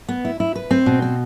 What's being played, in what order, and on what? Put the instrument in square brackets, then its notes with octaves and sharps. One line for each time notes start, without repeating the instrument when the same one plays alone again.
[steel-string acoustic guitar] B3
E4
E4
B4
C4
B2
C4